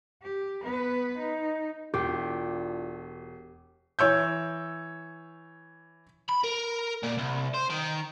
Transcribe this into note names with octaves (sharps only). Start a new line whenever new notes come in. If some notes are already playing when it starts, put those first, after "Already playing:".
G4
B3 B4
D#4
E1 D4 E4 F4 G4
E3 C#5 E6 G6
B5
A#4
A#2
C2
C5
D#3